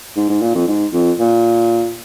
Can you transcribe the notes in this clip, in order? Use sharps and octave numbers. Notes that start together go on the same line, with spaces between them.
G#2
G#2
A#2
F2
G#2
F2
A#2